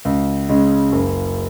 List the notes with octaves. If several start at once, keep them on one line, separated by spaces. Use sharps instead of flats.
C#2
C#3 G#3 C#4
F#1